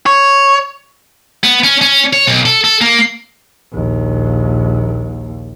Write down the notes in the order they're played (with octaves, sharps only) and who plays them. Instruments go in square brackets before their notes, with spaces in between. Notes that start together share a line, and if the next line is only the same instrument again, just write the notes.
[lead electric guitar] C#5
[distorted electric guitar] B3
C#4
C#4
C#5
B1
A4
A4
A#3
[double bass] A#1 D#2